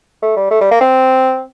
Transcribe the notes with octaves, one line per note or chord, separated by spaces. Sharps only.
A3
G3
A3
G3
A#3
C4